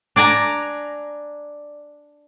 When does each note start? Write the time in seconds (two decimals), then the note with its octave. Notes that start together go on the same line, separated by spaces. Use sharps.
0.16 D4 D5 G#5 A#5